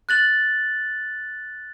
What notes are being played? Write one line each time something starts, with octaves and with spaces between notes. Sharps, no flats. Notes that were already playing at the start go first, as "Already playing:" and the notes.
F#6 A6 F#7